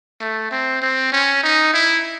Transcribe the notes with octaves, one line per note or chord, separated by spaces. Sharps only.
A3
C4
C4
C#4
D#4
E4